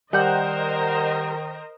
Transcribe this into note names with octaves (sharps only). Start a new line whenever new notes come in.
D#3 G3 A#4 C5 D#5 F#5 G6